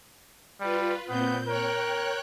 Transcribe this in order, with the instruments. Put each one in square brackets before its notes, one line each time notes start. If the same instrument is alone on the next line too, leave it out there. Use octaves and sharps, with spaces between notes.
[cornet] G3 [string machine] F4 B4
[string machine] A#2 C4 G6 [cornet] B3
[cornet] A#4 [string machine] C#5 G5 F#6